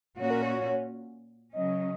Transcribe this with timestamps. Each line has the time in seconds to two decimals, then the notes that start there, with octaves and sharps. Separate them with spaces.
0.18 A#2 A#3 C#4 F#4 C#5
0.31 A#4
0.42 C#5
1.53 C#3 F#3 C#4 D#5